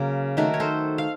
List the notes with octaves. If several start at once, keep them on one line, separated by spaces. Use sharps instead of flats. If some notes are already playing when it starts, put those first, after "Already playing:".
Already playing: C#3 F#3 A#3
D#3 A3 F#4 A#4
C#5
A4 C5
F5